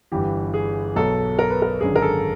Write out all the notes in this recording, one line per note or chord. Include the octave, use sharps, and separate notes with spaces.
G1 G2 E3 G4
G#4
B1 B2 F#3 A4
A#4
B4
A#4
G#1 F#2 D3 G#4
A#4
A4